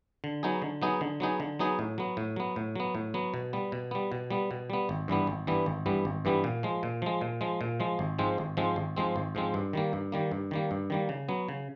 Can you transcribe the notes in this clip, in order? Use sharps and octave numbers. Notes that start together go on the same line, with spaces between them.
D3
F#3 B3 D#4 G#4
D3
F#3 B3 D#4 G#4
D3
F#3 B3 D#4 G#4
D3
F#3 B3 D#4 G#4
A2
F#3 B3
A2
F#3 B3
A2
F#3 B3
A2
F#3 B3
B2
G3 B3
B2
G3 B3
B2
G3 B3
B2
G3 B3
G#1
G2 E3 G3 B3
G#1
G2 E3 G3 B3
G#1
G2 E3 G3 B3
G#1
G2 E3 G3 B3
A#2
F3 G#3
A#2
F3 G#3
A#2
F3 G#3
A#2
F3 G#3
G#1
G#2 F3 G#3 C4
G#1
G#2 F3 G#3 C4
G#1
G#2 F3 G#3 C4
G#1
G#2 F3 G#3 C4
G2
D#3 G3 A#3
G2
D#3 G3 A#3
G2
D#3 G3 A#3
G2
D#3 G3 A#3
C#3
F#3 B3
C#3